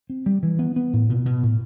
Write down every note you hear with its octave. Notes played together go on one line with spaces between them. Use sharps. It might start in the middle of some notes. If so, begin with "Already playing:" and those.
C4
G3
E3
B3
B3
A2
B2
B2
A2